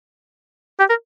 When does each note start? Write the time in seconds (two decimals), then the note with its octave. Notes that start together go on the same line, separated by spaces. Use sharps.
0.79 G4
0.90 A#4